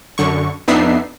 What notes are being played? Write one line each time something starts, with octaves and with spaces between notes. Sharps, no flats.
F#2 D3 C#6
F2 B3 D4 D#4 E5 C7